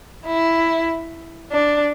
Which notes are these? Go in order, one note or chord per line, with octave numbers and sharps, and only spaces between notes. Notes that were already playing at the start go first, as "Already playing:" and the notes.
E4
D4